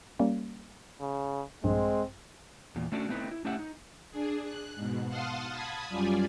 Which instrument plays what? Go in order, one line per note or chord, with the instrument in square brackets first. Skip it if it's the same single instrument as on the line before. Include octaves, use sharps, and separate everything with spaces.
[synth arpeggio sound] G3 A#3 C#4
[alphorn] C#3
[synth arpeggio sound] A#1 G2 [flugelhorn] G#3 [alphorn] C4
[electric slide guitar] E2 A#2
A3 C#4 D4 F#4 G#4 A4
A3 B3 C4 D#4 E4 B4
E4
A3 C#4 E4 G4 E5 F#5
D#4
[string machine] D4 G#4
F#6
G#2 B2
F5 F#5 A5 C6 D#6 F6
A5 B5 D#6 G#6
F#2 G3 F4 D5 G#5